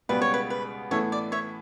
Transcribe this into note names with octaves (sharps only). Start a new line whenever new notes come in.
C#2 B2 G3 B3 F#4 B4
C#5
B4
B4
A2 E3 B3 E4 A4 C#5
D5
C#5 E5